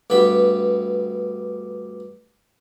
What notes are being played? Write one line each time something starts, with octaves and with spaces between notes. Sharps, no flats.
D2 G2 B3 B5